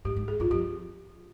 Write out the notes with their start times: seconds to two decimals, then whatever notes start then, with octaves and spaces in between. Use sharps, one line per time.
0.05 G#2 G4
0.16 G#2
0.28 G#4
0.40 G2 F4
0.51 F2 G4